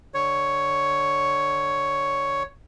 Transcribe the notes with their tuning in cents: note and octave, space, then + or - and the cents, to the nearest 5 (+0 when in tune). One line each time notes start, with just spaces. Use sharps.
D3 +25 C#5 +5